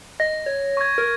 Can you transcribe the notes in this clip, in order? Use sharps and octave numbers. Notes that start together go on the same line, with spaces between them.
D#5 A#6
C#5
C#6 G#6
A#4